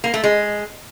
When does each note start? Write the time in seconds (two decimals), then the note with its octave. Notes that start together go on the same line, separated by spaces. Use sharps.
0.04 A#3
0.14 A3
0.24 G#3